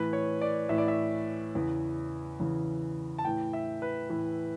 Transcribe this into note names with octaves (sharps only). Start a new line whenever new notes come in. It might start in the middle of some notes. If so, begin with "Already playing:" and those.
Already playing: A2 E3 B4
C#5
D5
A2 E3 E5
D5
E5
E2 C#3 E3
E2 C#3 E3
A5
A2 E3 G5
E5
B4
A2 E3